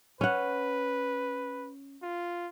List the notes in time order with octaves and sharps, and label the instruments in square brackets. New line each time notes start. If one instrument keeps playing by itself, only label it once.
[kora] C#4 F#5 [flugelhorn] B4
[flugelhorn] F4